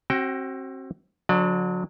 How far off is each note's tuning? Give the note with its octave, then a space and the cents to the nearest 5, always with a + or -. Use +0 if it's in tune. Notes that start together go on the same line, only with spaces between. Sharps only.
C4 +30 F#4 +30 G5 +0
D3 -20 F#3 -30 D5 +35